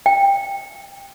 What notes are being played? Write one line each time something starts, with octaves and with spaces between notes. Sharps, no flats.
G5